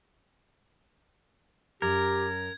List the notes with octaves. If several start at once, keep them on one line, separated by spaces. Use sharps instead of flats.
F#2 G4 A#4 G#6